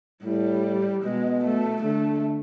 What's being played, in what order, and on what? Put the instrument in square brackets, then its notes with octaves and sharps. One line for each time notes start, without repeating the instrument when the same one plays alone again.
[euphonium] A2 [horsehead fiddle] G3
[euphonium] B2 [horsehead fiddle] G#3
[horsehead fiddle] A3
[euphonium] D3 [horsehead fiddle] A3